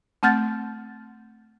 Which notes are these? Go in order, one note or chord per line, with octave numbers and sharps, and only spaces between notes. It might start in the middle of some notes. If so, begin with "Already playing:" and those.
A3 C4 F#5 F6 G6 A6